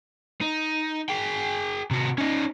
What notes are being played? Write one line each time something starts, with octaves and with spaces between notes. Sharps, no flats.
D#4
G#4 G5
C3 F#4
C#4 D#4